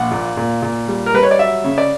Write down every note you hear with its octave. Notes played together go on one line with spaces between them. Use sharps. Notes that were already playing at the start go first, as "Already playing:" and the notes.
Already playing: A#1 F#5
A#2
A#2
A#2
G3
A#4
G3 B4
C#5
D5
F#3 E5
C#3
D5